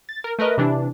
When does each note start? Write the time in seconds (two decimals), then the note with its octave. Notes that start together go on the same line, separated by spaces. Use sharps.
0.09 A6
0.24 A#4
0.39 A3 A#4 B4 D#5
0.58 C3 E3 D4